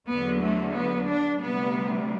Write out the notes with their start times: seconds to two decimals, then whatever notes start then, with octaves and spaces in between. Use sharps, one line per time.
0.08 E2 D3 F#3 B3
0.42 A3
0.75 B3
1.08 D4
1.41 D2 C3 G3 B3